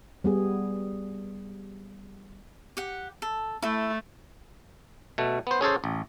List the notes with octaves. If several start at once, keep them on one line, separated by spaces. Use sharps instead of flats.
G3 B3 G#4
G4 F#5
A4
A3 E4 A4
B2 A3
B3 C5
C#4 G#4 A4 C5
A1